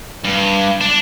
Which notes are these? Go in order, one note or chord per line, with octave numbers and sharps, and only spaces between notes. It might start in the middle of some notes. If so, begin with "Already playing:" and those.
G2
D4